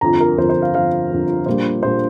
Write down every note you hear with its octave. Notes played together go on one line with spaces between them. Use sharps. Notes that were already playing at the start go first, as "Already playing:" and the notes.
G1 F2 F3 A#5
A#4
G1 F2 F3 C5
C5
F5
G1 F2 F3 F5
G1 F2 F3
A#1 A#2 G3 A#3 C5
A#1 A#2 G3 A#3 C5